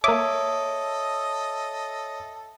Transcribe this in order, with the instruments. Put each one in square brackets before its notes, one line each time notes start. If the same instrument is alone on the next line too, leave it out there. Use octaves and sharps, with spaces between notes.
[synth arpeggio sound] A#3 D6 [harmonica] A4 D#5 [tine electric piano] C#5 E5 D#6